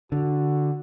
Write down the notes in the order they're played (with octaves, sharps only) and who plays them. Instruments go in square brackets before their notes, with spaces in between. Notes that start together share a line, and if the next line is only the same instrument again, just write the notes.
[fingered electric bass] D3 [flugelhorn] F#4